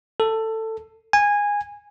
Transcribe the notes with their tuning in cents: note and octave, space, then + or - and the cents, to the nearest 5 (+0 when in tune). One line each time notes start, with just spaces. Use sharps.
A4 +15
G#5 -15